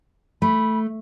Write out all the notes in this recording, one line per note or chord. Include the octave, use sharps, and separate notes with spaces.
A3 B5